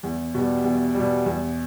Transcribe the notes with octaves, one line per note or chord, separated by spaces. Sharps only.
E2
B2 G3
E2
G3
B2
E2